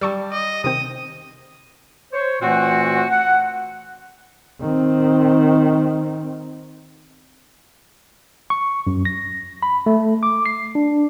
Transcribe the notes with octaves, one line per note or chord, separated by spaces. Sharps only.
G3 A5 C#6 E6
D#5 D6
C3 D#3 C4 D#6
C5 C#5 C#6
A#2 E3 A3 C4 F#4
F#5
D#3 C4
C#6
F#2
A#6
B5
A3
D6
C7
D4